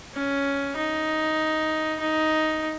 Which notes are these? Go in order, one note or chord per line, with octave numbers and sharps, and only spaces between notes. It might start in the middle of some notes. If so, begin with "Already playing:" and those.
C#4
D#4
D#4